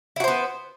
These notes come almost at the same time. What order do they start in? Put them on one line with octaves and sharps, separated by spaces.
E4 F#4 C5 B3